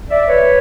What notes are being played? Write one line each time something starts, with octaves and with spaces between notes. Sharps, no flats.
D5 E5
B4 C#5